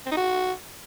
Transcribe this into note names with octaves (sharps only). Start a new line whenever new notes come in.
C4
D#4
F#4